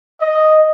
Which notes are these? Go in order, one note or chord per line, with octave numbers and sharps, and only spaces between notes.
D#5